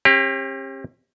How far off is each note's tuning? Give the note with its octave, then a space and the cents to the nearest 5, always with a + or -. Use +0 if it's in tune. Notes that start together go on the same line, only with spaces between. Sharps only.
C#4 -45 G4 +25